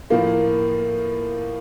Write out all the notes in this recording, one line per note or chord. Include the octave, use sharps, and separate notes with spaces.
A2 F3 A#3